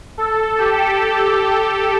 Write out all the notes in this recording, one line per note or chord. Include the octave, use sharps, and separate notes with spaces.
A4
G4